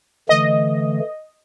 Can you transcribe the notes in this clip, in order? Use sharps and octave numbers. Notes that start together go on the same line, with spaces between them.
D3 E3 A3 D#5